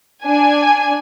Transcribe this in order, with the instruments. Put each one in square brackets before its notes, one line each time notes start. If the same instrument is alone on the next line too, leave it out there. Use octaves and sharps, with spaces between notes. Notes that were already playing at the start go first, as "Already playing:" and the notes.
[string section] D4 G#5